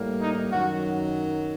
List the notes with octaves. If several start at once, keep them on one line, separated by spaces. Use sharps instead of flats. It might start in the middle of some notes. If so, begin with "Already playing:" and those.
Already playing: A2 G3 A#3
D#4
F#2 D#3 F#3 F#4